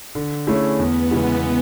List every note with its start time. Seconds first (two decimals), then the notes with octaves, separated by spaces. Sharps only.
0.15 D3
0.47 A3 C#4 E4 G#4
0.79 E2 B3
1.11 C#3 E3 G#3